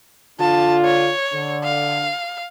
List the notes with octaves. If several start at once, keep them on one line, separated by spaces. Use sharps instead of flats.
D3 D4 F4 A5
C#5
D3
F5